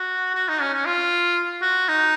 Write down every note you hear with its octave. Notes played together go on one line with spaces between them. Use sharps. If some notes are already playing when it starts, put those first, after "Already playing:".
Already playing: F#4
F#4
D#4
C#4
C#4
F4
F#4
D#4